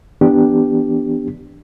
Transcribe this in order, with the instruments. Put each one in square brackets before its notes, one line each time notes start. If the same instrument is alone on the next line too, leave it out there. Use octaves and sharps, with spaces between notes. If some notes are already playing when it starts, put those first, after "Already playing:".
[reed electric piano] E3 B3 D4 G4